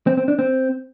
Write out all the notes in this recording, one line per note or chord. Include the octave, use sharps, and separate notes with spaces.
C4
C4
D4
C4